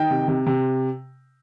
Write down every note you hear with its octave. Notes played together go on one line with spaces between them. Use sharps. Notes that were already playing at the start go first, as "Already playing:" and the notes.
Already playing: D#3 G5
C3
C3
C3